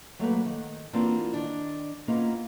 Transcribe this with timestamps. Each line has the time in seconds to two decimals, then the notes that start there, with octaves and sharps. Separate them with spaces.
0.19 F#3 A3 A#3 B4
0.45 D#3 F#5
0.93 E3 A#3 C4 D4 F4 F#4
1.33 D#3 D4
2.08 A#3 B3 C#4 D#4 F4 G#4